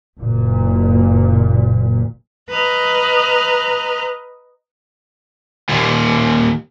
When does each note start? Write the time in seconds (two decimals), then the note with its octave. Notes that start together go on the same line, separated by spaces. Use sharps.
0.20 F#1 A#2
2.49 B4 D#5 A#5 F6
5.69 D#2 A#2